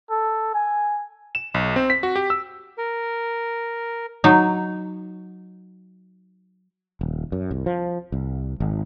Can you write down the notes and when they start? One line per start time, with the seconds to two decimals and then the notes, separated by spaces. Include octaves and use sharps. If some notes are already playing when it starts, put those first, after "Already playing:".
0.10 A4
0.54 G#5
1.35 E7
1.54 B1
1.76 C4
1.90 B6
2.03 F#4
2.16 G4
2.30 E6
2.78 A#4
4.24 F#3 D#4
7.01 D#1
7.32 F#2
7.51 C2
7.66 F3
8.12 C2
8.60 G#1